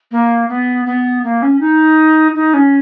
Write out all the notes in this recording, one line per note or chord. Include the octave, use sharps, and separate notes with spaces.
A#3
B3
B3
A#3
C#4
D#4
D#4
C#4